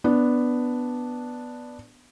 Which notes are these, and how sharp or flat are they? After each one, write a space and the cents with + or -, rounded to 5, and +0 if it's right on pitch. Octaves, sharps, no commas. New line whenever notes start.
B3 +0 D4 +0